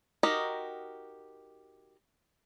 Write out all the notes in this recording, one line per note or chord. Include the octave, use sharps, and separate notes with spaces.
D#4 F#4 G4 A#4 D#5